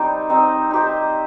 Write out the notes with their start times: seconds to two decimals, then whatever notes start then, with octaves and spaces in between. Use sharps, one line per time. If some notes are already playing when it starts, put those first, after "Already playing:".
Already playing: G3 C4 D#4 C5 D#5
0.29 C4 D#4 C5 D#5
0.71 D#4 G4 C5